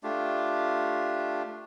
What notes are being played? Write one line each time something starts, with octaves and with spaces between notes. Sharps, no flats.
A3 D4 F4 G4